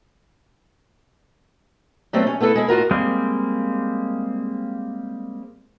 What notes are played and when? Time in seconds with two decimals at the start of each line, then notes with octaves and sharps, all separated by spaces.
2.13 F#3 G3 A3 B3 C4
2.27 C#4
2.40 A3 B3 E4 A4
2.55 G#3 E4
2.68 A2 F4 F#4 A#4
2.91 G3 G#3 A#3 C4